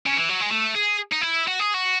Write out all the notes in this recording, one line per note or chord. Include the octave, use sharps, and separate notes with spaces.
C#3
E3
F#3
G#3
A3
G#4
D#4
E4
F#4
G#4
F#4